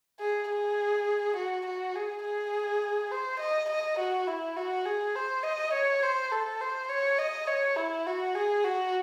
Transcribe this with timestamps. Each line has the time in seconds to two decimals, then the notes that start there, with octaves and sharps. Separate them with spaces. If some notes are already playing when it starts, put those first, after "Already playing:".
0.20 G#4
0.50 G#4
1.37 F#4
1.66 F#4
1.95 G#4
2.25 G#4
3.11 C5
3.40 D#5
3.70 D#5
3.99 F#4
4.28 E4
4.56 F#4
4.86 G#4
5.15 C5
5.44 D#5
5.73 C#5
6.03 C5
6.32 A4
6.61 C5
6.89 C#5
7.19 D#5
7.47 C#5
7.77 E4
8.06 F#4
8.35 G#4
8.64 F#4